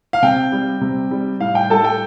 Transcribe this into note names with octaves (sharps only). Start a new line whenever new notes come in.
F5
C3 G5
G3
C3
G3
A2 F5
G5
G3 A4 A5
G5